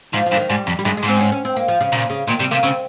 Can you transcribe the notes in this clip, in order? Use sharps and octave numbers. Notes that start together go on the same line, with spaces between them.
G#2 F3
F3
G2
D#3
G#2 G3
F2
G3
G2 G#3
G#3
G#2
C4
C#4
C#4
C4
A#3
F3
C#3
A#2 C#3
C#3
A#2 D#3
C3 G3
C3 A#3
C#3 C4